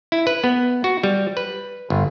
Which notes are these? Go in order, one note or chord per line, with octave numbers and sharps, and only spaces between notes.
E4
B4
B3
F#4
G3
B4
G1